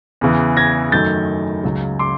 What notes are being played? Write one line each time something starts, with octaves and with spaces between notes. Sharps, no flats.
E2 C#3 E3
G#6 A#6
F#2 D#3 F#3 A3 G6 A6
C#2 C#3 F#3
C6 D6